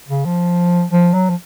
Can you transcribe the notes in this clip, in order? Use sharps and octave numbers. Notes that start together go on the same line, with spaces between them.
C#3
F3
F3
F#3
F3